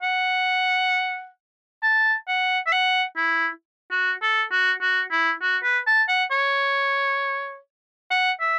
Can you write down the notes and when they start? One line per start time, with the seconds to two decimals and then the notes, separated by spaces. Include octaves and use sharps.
0.02 F#5
1.83 A5
2.28 F#5
2.66 E5
2.72 F#5
3.17 E4
3.91 F#4
4.22 A4
4.51 F#4
4.81 F#4
5.11 E4
5.42 F#4
5.63 B4
5.87 A5
6.08 F#5
6.31 C#5
8.11 F#5
8.41 E5